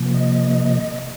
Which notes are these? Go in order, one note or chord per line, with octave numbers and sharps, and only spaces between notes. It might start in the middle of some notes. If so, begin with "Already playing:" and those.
Already playing: C3 F3 A#3
D#5